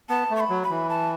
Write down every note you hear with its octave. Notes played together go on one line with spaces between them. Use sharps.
B3 A5
A3
C#6
B5
F#3
B5
E3
A5